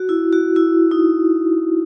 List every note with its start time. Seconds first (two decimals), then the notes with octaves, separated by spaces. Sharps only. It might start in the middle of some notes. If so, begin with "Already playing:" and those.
Already playing: F#4
0.09 E4
0.33 F#4
0.56 E4
0.91 D#4